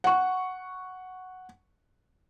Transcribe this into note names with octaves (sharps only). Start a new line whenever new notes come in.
F#5 C#6